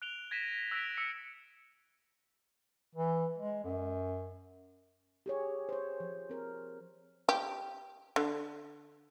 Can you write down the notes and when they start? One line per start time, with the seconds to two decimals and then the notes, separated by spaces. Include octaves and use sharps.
0.02 F#6 D7 F7 G7
0.31 G#6 A#6 B6 D#7 E7
0.71 E6 F#6 A#6 B6 D7 F7
0.97 E6 B6 C#7
2.95 E3
3.38 G#3
3.64 F#2
5.26 G4 G#4 C#5
5.69 C5 C#5
6.00 F3
6.30 C4 A#4
7.29 G4
8.16 D3